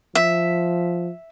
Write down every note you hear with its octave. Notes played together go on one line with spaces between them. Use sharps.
F3 E5